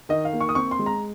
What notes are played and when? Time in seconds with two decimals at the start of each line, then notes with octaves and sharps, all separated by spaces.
0.09 D#3 D#5
0.25 F5
0.33 A#3
0.41 C#6
0.49 D#6
0.55 C4 C#6
0.71 C6
0.79 G#3
0.86 A#5